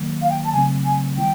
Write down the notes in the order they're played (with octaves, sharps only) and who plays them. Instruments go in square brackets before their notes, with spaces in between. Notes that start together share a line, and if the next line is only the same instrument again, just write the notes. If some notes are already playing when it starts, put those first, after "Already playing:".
Already playing: [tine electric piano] D#3 F#3 A#3
[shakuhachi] F5
G5
A5
[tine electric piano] C#3 F#3 A3 C4 [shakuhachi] G#5
[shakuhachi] G#5
[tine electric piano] D#3 G3 B3 E4 [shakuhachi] G5